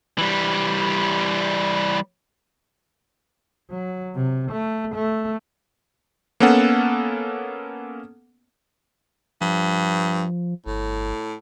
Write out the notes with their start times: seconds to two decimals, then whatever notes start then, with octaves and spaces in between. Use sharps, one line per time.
0.18 E3 G3
3.70 F#3
4.15 C3
4.52 A3
4.95 A3
6.40 A#3 B3 C#4 A4 F#5
9.41 G2 F3
10.66 G1 A2